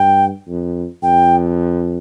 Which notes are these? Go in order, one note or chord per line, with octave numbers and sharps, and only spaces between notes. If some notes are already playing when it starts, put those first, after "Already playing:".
Already playing: G2 G5
F2
F2 G5